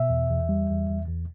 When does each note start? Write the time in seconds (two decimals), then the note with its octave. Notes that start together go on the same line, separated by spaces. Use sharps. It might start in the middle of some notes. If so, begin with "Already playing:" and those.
Already playing: B2 E5
0.10 E2
0.30 E2
0.49 G3
0.70 E2
0.89 E2
1.08 E2